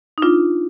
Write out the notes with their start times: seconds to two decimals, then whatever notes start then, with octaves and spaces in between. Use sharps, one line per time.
0.18 D#4
0.22 D4 F4